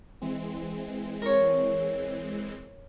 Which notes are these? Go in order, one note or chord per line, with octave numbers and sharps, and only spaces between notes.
E3 G#3 C4
A#4 C#5